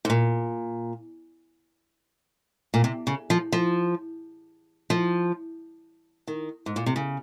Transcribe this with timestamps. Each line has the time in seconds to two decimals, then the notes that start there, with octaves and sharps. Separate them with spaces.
0.05 G#2
0.10 A#2
2.74 A#2
2.84 C3
3.07 C#3
3.30 F3
3.52 F3
4.90 F3
6.28 D#3
6.66 G#2
6.76 A#2
6.86 C3
6.96 C#3